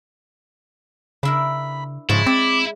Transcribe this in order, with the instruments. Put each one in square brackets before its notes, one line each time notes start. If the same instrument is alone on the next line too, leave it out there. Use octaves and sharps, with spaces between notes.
[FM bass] C#3 [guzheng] D4 E4 A#4 [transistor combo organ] B5
[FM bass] G#2 [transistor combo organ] C#3 F3 [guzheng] G#3 C#5 A5 [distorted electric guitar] E4
[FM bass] C4 [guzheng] D5 [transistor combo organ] D6